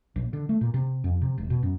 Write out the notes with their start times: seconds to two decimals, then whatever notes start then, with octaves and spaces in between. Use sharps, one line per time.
0.16 A#1
0.33 D3
0.49 A3
0.61 A#2
0.74 C3
1.04 F2
1.22 C3
1.38 E1
1.50 B2
1.63 F#2